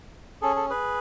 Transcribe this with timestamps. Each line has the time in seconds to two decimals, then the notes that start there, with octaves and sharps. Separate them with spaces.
0.42 C#4 G#4 A4
0.56 A4
0.70 G#4 B4